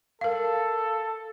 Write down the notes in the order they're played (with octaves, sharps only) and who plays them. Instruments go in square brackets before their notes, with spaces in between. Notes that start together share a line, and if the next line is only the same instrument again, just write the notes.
[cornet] A4 [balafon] A#4 F5